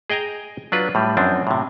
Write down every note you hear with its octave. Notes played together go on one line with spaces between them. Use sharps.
G#4 D#5 G5 G#5 A#5
F#3 D4 F4 B4
A2 G3
F#2 F3 C4 D4
A2 C3